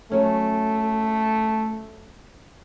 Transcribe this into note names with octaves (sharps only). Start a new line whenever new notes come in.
F#3 A3 C#4